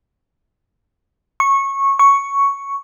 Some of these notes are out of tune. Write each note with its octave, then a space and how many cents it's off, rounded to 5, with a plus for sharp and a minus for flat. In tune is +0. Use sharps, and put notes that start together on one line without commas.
C#6 -15
C#6 +5